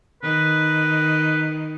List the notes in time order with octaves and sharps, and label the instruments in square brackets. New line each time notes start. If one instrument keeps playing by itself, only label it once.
[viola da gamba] D#3 [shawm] B4